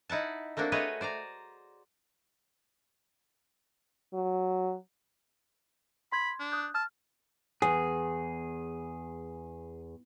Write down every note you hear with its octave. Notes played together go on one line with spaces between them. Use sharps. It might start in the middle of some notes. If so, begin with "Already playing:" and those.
D#4 E4 F#5 A5
A3 A#3 C4 D4 F#4
A3 F#4 G#4 B4 C#5 D#5
C5 D5 G#5 A#5
F#3
B5 C6 G#6
D4
D#6 F#6 G6
A5 E6 F6
E2 G#4